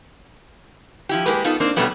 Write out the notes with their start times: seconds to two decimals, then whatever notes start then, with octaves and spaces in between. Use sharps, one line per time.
1.09 F3 E4 G4
1.26 G#3 A#3 G4 A#4 B4
1.44 B3 D#4 F4 A4
1.60 A#3 C4 D4 D#4
1.76 B2 F#3 G3 A3 B3 C#4